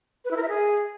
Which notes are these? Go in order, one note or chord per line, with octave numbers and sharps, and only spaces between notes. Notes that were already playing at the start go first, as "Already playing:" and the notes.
B4
E4
A#4
E5
G#4